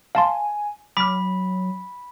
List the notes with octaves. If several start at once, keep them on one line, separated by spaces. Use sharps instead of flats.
F5 G#5 A5 C6
F#3 B5 D6 F6 B6